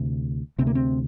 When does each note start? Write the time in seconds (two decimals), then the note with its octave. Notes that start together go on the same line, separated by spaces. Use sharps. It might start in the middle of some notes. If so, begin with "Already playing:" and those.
Already playing: D2 C3
0.59 D2 C3 C4
0.67 A#3
0.75 C4